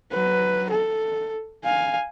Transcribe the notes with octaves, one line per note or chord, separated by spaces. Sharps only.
F#3 B4
A4
F5 G#5